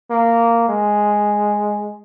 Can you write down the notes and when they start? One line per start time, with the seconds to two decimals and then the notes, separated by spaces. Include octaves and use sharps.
0.11 A#3
0.69 G#3